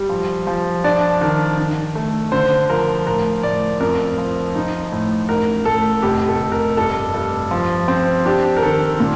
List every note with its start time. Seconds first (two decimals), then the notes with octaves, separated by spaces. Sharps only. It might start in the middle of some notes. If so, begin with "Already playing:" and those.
Already playing: G3
0.09 F3
0.47 F3
0.84 D4 D5
1.21 D#3
1.58 D#3
1.95 A3
2.32 D3 C5
2.69 F3 A#4
3.07 A2 A#4
3.43 A2 D5
3.80 F2 A#4
4.18 F3
4.55 D#4
4.92 A2
5.29 A1 A#4
5.65 A2 A4
6.02 F1 G4
6.28 A4
6.40 F1
6.52 A#4
6.77 G2 A4
7.14 G2
7.51 F3
7.88 C4
8.26 D4 G4
8.57 A#4
8.62 D#3 A4
9.00 A#2